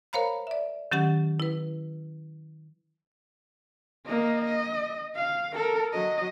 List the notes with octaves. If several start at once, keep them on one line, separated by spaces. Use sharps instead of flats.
A#4 C5 C#5 F5 A#5 B5
D5 E5
D#3 F#3 C#4 G4 F#5 A6
E4 B4
A#3 D#5
D#5
F5
A4 A#4
F#3 D#5